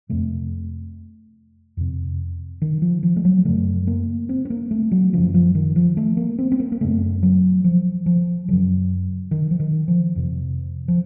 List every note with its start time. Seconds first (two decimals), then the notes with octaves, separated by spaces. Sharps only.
0.09 F2 C3 A3
1.77 F2 C3
2.62 D#3
2.82 F3
3.03 F3
3.16 A3
3.25 F#3
3.45 F#2 C#3 A3
3.87 A#3
4.29 C4
4.45 C4
4.50 A#3
4.71 A3
4.92 F#3
5.13 F#2 C#3 F3
5.34 F3
5.55 D#3
5.76 F3
5.97 A3
6.17 A#3
6.39 C4
6.52 C4
6.60 A#3
6.72 A#3
6.81 F#2 C#3 A3
7.23 F#3
7.64 F3
8.06 F3
8.48 F#2 C#3 F#3
9.31 D#3
9.51 F3
9.60 D#3
9.88 F3
10.16 F2 C3
10.88 F3